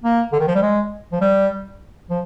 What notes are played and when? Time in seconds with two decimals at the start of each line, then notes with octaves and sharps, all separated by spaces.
0.04 A#3
0.33 D3
0.40 D#3
0.48 F3
0.55 G3
0.62 G#3
1.13 F3
1.21 G3
2.10 F3